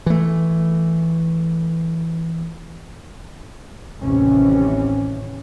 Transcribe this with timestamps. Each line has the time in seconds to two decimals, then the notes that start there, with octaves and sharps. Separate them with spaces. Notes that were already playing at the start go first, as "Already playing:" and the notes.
0.06 E3 A3
4.00 A1 D#2 C3 E3 C#4